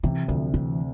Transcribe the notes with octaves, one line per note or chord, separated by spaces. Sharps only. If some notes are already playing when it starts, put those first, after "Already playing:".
C3 E3
D2 F3
C3 E3